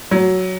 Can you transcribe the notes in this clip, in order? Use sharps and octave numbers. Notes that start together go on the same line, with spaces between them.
F#3